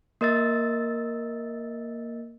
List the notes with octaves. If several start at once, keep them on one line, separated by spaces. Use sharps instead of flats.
A#3 A#4 D#5 E6 A6